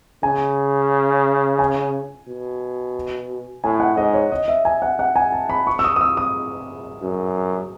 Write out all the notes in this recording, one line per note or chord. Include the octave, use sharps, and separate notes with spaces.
C#3 G#5
G#5
B2
A2 G#5
F#5
G#2 D#5
C#5
D#5
E5
G#5
F#5
F#5
G#5
A5
B5
C#6
E6
D#6
D#6
E6
D#6
F#2